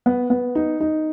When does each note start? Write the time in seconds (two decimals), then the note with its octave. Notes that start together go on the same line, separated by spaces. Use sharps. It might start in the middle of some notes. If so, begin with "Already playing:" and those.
0.06 B3
0.30 B3
0.55 D#4
0.80 D#4